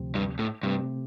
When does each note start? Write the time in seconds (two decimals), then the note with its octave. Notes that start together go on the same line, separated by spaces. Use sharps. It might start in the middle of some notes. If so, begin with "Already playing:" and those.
Already playing: D2 C3 F3 C4
0.15 G2
0.39 A2
0.63 G2 C3 A3 C4 G4